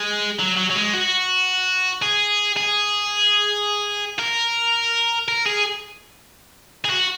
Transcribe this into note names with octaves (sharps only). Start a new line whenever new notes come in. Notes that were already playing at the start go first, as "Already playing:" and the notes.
Already playing: G#3
F#3
F#3
F#3
G#3
F#4
G#4
G#4
A#4
A#4
G#4
G#4
F#4